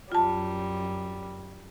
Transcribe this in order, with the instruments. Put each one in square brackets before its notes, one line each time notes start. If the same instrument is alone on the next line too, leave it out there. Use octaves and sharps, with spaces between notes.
[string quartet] F#2 G3 [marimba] F4 A5